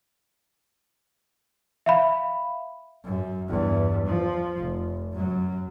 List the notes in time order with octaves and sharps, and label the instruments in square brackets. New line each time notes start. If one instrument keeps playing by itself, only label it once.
[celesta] E5 F5 B5
[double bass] F#2
E2 G2
F3
F1
F#2 F#3